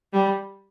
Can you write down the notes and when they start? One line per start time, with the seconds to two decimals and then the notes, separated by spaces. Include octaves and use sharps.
0.13 G3